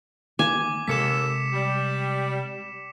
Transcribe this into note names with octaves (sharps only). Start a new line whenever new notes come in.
D#3 A#3 G#5 D6
D#2 C3 G#3 A#3 A4 B6 C#7 E7
G3